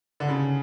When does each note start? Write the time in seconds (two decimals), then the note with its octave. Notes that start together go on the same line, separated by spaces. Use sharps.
0.20 D3
0.29 C#3